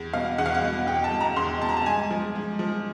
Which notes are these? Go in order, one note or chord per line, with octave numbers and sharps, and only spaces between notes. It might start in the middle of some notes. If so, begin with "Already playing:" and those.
Already playing: E2
B2 F5
E2 F#5
F5
F#5
B2
E2 G5
A5
B2
A#5
E2 C6
B2 A5
A#5
A5
G#2 G#5
F3
G#2
F3